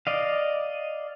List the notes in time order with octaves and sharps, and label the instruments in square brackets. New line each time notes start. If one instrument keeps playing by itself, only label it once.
[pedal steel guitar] D5 D#5 F5